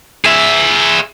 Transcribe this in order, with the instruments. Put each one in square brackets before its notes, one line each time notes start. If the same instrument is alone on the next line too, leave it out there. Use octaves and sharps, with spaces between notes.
[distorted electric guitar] G#4 E5